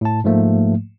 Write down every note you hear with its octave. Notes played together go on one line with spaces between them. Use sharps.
A2 A5
G#2 F3 A3 A#3